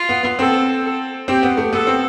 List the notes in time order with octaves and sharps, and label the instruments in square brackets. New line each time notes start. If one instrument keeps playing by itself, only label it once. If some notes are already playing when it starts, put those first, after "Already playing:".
Already playing: [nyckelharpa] F4
[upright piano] B3
B3
[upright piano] C4 [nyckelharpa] A4
[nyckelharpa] A4
[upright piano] C4 [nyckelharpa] G4
[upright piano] B3
A3
[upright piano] B3 [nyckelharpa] A4
[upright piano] C4